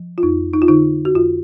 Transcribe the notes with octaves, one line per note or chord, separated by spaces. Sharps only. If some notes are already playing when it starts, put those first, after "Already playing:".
Already playing: F3
F4
F2 D#4
D#4
F4
D3 D#4
F#4
F2 F4